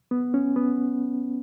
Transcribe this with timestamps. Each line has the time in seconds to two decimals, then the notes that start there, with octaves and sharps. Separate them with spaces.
0.11 B3
0.34 C#4
0.56 B3